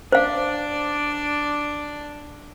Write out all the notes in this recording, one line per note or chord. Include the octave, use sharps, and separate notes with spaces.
D4 C5 D5 F5